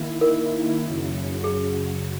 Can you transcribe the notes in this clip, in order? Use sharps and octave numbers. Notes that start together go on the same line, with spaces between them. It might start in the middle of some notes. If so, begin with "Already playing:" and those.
Already playing: D#3 A#3 E4
A#4
F#2 C#3 F#3
G#4